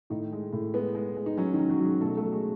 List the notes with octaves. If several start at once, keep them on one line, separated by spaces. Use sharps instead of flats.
A2 D#3 D#4
G#3
A2
G#3 B3
G#3
G#3
D#4
F#3 C#4
D#3 D#4
F#3
F#3 F#4
F#3 G#3 G#4
B2 A3 A4
A3 A4
F#3 F#4
G#3 G#4